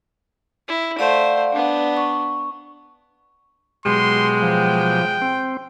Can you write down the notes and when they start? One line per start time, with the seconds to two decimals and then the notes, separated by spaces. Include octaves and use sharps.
0.68 E4
0.99 A3 C5 D5 F5 F#5
1.52 B3 D4
1.97 C#6
3.86 B2 F#3 G#3 G4 C6
4.42 F3 G5
5.22 C4